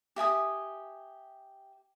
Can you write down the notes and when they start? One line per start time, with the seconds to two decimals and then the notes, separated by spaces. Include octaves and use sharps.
0.16 G4 E5 G#5 D#6